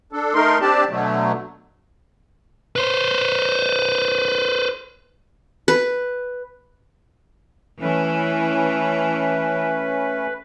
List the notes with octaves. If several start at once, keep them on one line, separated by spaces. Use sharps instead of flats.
D4 A4
A3 D#4 A#4 C6
C4 D4 G4 D5 A5
B2 D3 F#3 A3
B4 C5
B4
E3 A3 C#4 B4